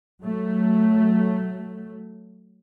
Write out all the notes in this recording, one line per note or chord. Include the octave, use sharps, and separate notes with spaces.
F#3 A3